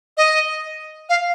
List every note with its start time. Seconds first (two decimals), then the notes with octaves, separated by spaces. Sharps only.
0.17 D#5
1.09 F5